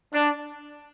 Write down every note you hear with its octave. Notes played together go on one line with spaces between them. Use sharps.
D4